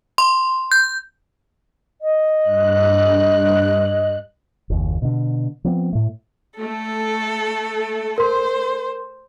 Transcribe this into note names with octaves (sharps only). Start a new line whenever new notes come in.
C6
G6
D#5
G2 F#6
F#1 D#2
B2 D3
F3 B3 C4
A2 A3
A3 A4
A#4 C5 C6